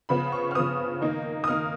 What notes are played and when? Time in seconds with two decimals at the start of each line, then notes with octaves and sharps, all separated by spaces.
0.09 C#3 F3 B3 B5
0.32 C#6
0.51 F6
0.55 C#3 F3 B3 D#6
1.01 D#3 A#3 D#4
1.44 D#6
1.48 D#3 A#3 D#4 F6